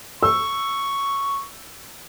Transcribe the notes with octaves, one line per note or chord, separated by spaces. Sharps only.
C#6 E6